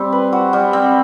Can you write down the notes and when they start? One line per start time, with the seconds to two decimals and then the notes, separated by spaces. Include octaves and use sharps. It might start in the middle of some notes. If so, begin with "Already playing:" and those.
Already playing: G3 C4
0.12 B4
0.32 F#4
0.53 G3
0.73 C4